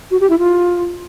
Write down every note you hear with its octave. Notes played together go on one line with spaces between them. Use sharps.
F#4
G4
E4
F4